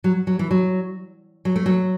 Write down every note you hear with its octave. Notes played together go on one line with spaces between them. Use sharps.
F#3
F#3
E3
F#3
F#3
A3
F#3